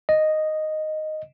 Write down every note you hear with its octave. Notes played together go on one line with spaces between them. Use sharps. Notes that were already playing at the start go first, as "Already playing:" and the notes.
D#5